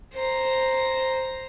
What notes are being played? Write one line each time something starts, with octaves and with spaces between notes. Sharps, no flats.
C5 A#5